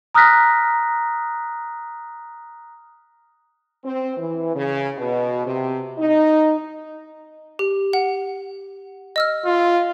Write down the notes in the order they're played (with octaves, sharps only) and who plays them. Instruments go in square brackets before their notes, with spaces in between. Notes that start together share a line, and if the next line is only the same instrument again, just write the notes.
[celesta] A#5 D#6 F6 F#6 A#6 B6
[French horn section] C4
E3
C#3
B2
C3
D#4
[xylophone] G4
F#5
D#5 E6 F6
[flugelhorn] F4